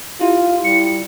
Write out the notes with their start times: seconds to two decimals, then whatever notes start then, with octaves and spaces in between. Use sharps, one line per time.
0.20 E4 F4 G4
0.64 G3 C#7